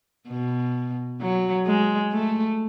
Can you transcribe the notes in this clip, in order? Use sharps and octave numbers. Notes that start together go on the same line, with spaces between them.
B2
F#3
G#3
A3